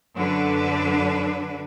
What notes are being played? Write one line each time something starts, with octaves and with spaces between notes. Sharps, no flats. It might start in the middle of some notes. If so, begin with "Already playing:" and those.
F#2 D3 D4 B4